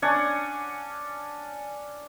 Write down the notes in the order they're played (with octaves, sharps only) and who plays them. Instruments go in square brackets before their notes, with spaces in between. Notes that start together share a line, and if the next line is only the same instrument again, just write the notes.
[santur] C#4 D4 F#5 G#5